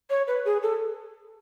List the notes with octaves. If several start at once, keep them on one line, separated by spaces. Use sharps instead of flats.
C#5
B4
G#4
A4